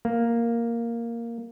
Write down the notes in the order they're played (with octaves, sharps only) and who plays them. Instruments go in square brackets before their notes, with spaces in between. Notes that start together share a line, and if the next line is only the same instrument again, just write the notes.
[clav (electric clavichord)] A#3